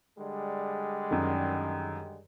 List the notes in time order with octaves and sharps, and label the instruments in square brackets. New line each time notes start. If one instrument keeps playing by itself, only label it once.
[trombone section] D3 G3 G#3
[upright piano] F#2 D#3